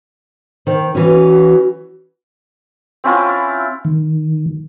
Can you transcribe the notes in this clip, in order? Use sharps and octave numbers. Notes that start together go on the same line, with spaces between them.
D#3 C5
E3 C#4 F#4
C4 C#4 E4 F4
D#3